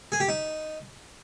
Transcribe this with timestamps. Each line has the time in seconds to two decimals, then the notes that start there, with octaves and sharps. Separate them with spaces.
0.12 G#4
0.20 G4
0.29 D#4